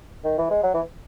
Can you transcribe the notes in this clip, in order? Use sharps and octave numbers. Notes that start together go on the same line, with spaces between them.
D#3
E3
G#3
F#3
E3